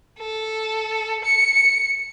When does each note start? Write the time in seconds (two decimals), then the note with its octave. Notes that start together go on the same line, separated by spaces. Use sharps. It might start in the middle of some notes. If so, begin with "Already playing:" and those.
0.19 A4
1.24 C#7